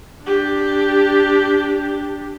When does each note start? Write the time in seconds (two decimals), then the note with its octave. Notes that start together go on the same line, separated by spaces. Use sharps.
0.22 D4 G4